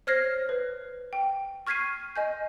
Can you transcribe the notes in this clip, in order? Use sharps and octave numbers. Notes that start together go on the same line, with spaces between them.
C5 C#5 F6 G#6 A#6 C7
B4
G5
C#6 F6 G#6 B6 C7 D#7
D#5 G#5 G6